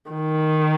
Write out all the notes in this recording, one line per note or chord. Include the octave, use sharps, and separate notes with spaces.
D#3